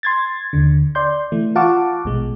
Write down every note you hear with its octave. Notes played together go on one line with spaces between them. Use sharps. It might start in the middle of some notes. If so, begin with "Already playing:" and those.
C6 G#6 A6
D#2 D3
D5 C6 G6
E3 A3
F4 F5 F#5 A5 C#6 D6
A#1 B2 G#3